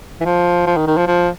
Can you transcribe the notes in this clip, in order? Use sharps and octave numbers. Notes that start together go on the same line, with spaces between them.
E3
F3
F3
D#3
D#3
F3
F3